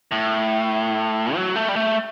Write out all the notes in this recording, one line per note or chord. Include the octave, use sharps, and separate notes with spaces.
A2
F#3
A3
G3
A3